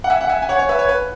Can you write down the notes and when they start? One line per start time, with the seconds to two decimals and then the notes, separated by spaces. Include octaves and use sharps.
0.04 F#5
0.10 E5 G#5
0.21 F#5
0.29 E5 G#5
0.42 G#5
0.49 C#5 F#5
0.59 C#5
0.69 B4 E5
0.79 C#5
0.89 B4